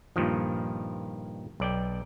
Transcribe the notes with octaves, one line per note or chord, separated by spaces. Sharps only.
G2 A#2 D#3 F3
B1 D5 G5